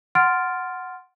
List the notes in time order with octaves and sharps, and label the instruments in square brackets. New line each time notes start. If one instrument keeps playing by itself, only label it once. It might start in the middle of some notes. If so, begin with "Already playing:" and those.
[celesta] F#5 C6 F6 A6 D7